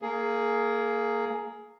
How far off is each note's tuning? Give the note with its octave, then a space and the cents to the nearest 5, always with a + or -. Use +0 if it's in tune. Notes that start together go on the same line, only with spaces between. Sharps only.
A#3 -10 G#4 +15